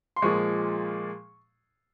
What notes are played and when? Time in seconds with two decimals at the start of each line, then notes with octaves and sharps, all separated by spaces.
0.16 C6
0.22 A#2 F3 G#3 C#6